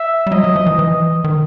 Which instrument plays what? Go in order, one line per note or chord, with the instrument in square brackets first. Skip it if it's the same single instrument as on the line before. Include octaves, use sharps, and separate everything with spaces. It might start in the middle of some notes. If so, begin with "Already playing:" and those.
Already playing: [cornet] E5
[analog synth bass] G3
[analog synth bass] F#3 [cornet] D#5
[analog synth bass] F#3
F3
E3
[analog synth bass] E3 [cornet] D#5
[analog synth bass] D#3